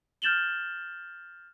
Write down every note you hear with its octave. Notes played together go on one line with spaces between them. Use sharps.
F6 G6 A6 E7 F#7 G7